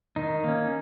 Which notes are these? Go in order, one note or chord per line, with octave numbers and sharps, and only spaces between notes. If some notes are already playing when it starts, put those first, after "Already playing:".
D#3 D#4
A#3 C#4